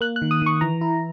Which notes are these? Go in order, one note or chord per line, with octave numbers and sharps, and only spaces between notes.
A#3 F#6
F#6
D#3
D#6
D#3 C#6
E3 A#5
E4